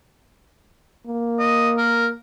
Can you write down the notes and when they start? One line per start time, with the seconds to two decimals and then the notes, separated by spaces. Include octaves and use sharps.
1.07 A#3
1.39 D#5
1.78 A#4